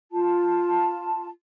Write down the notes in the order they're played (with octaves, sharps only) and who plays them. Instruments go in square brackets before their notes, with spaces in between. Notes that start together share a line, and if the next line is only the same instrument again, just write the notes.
[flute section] F4 A5